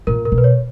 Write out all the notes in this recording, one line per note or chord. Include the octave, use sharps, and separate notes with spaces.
A#2 A#4
A#4
B2
B4
C#5